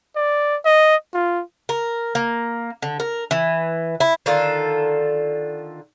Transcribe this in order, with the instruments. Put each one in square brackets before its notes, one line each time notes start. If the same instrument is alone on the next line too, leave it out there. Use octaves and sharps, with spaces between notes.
[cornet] D5
D#5
F4
[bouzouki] A#4
A#3
D3
A#4
E3
E4
D3 D#3 F4 A4